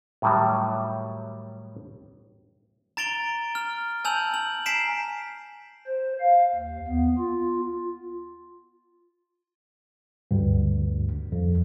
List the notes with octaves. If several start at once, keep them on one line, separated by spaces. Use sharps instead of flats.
A2 D#3 F#3 G3
A#5 A6 D7 F7 G7
F6
G#5 A5 E6 G6 F7 F#7
F#7
G#5 A#5 B6 C7 D7 E7
C5
F5
D#2
B3
F4
D2 G2
F2